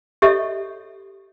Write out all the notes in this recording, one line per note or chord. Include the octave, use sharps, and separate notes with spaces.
G4 A4 C#5 D#5 E5